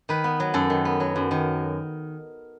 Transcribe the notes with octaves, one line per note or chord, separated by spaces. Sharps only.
D#3 B4
B3
F#3
F#2 A4
D#3
B3
F#3
F#2
D#3